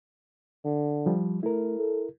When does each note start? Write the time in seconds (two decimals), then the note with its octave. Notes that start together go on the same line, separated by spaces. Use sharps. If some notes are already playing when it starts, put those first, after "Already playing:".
0.65 D3
1.06 F3 G3
1.43 A3 E4 A#4
1.79 A4